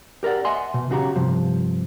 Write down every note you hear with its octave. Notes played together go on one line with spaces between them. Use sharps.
G4 A#4 B4 D5 F#5
D#5 E5 F#5 G#5 C6
B2
B1 C#3 F#4 G4 A#5
G2 C3 F3